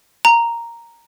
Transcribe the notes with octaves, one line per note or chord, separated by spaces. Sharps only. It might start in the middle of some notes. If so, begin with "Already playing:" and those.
A#5